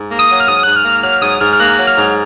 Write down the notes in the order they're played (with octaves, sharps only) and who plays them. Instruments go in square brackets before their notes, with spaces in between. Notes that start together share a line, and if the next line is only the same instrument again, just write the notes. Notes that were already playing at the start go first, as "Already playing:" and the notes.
Already playing: [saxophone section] G#2
A#3
[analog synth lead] D#6
[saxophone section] F#3
[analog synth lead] F6
[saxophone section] G#2 [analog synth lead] D#6
[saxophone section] G#2 [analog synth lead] F#6
[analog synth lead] F6
[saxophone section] A#3
[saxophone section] F#3 [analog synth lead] F6
[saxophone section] G#2 [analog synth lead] D#6
[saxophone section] G#2 [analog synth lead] F6
[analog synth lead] F6
[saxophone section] A#3 [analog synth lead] F#6
[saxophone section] F#3
[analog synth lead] F6
[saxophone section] G#2